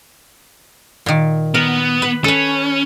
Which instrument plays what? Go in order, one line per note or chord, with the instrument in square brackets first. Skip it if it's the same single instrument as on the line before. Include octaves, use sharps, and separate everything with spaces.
[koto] A#2 D#3
[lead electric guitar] B3 [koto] A#4
[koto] B4
[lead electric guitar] C#4 [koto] A4 B4